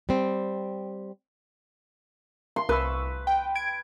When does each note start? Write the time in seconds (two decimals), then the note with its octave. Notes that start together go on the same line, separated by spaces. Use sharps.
0.09 G3 C4
2.56 C6
2.69 C2 B4 C#6 E6
3.27 G5
3.55 G#6 D7